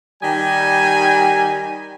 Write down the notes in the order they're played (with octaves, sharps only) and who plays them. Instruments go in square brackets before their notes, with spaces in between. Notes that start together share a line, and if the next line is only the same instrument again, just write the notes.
[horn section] D#3 G3 G4 G#5